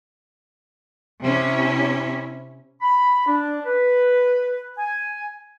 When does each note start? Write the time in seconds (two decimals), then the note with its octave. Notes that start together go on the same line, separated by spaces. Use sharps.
1.21 C3 C#4 E4
2.82 B5
3.28 D4
3.66 B4
4.78 G#5